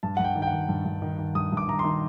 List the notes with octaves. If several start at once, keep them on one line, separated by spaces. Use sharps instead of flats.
G2 A5
G2 F#5
G5
D#3
G5
F#5
D#3
G2
G2
D#3
D#3
G2 D#6
G2
D6
D#3 A#5
C6
D#3